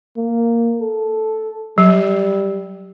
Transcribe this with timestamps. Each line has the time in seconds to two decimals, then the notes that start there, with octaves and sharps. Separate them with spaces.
0.17 A#3
0.81 A4
1.78 F#3 G3